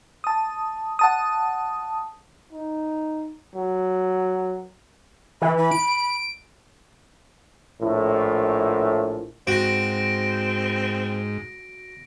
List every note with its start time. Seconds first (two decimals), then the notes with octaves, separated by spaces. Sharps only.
0.24 A5 D#6
0.99 F#5 A5 D#6
2.53 D#4
3.55 F#3
5.41 E3 B5
5.58 B5
5.71 D7
7.81 A#1 A2
9.47 G#2 C4 F#4 A#6 D7